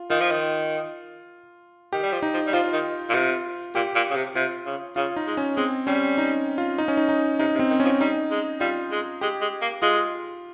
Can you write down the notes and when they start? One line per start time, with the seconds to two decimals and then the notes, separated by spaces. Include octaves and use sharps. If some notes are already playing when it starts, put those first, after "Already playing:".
Already playing: F4
0.10 D#3 F4
0.21 F3
0.31 D#3
1.93 D#3 G4
2.03 G3
2.12 F3
2.22 D#4
2.34 F3
2.47 G3
2.53 F3 F4
2.73 D#3
3.09 A#2
3.14 C3 F4
3.75 A#2 G4
3.95 A#2
4.10 C#3
4.16 C3
4.35 C3 F4
4.66 C#3
4.96 C#3 F4
5.16 D#4
5.26 G#3
5.37 C#4
5.56 G#3 C4
5.87 G3 C#4
6.18 D#4
6.58 F4
6.78 D#4
6.88 C#4
6.97 D#4
7.09 D#4
7.39 C3 D#4
7.55 C3
7.59 C4
7.70 D#3
7.80 F3 C#4
8.00 G3 D#4
8.31 G#3
8.60 G3 F4
8.91 G#3
9.21 G#3 G4
9.41 G#3
9.61 A#3
9.82 G#3 F4